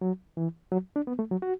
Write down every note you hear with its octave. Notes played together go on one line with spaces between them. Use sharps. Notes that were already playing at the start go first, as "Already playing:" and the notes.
F#3
E3
F#3
D4
B3
A3
F#3
F#4